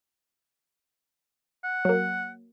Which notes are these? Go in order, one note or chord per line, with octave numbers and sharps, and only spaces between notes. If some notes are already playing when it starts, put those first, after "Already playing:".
F#5
F#3 A#3